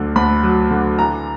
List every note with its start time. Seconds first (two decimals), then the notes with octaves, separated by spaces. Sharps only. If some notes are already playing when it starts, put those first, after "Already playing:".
Already playing: D2 D3 F#3
0.16 D2 B5
0.43 F#3
0.71 D3
0.98 E3 A#5